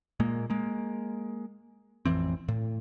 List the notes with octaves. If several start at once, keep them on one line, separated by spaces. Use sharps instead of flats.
A#2 G#3 A#3
G#3 A#3
A1 F2 E3 C4
A2